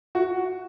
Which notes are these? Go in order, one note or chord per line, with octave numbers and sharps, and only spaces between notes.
F#4